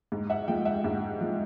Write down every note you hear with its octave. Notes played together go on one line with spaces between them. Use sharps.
G#2
E5 F#5
F3 G#3 F5 G5
E5 F#5
G#2
F3 G#3